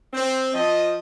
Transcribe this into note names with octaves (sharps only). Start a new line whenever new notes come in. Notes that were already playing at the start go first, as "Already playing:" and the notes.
C4
F3 D#5